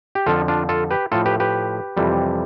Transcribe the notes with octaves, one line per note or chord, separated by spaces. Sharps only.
G4
F2 D3 F3 F4 A4
D4 F4
F4 A4
G4 B4
A2 F3 F4 A4
G4 B4
G4 B4
F2 C3 E3 G3